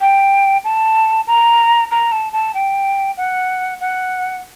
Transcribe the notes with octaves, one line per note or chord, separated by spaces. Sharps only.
G5
A5
A#5
A#5
A5
A5
G5
F#5
F#5